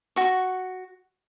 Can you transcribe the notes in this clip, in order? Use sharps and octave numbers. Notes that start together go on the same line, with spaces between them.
F#4 C#6